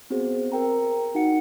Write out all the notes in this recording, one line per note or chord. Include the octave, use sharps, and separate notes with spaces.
B3 C4 F#4 G#4 C5
A#4 G5 A#5
D#4 F#4 F#5 C#7